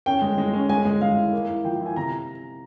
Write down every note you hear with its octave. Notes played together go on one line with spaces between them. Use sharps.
C#4 G5
G#3
G#3
C#4
G#3 G#5
G#3
G#3 F5
E4
A#3
E4
F3 G5
E4
G#5
C3 A#5